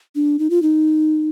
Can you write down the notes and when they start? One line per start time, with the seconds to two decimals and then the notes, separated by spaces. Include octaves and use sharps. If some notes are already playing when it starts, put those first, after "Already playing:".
0.15 D4
0.39 D#4
0.50 F4
0.62 D#4